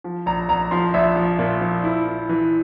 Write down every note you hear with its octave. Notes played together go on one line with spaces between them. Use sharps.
F3
A#1 A#5
A#1 A#5
F3 C6
A#1 E5
F3
A#2
F3
E4
E4
E3